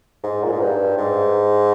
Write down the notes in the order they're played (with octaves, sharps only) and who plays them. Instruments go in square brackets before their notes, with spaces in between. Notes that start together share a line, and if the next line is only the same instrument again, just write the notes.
[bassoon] G#2
A#2
G#2
G2
G#2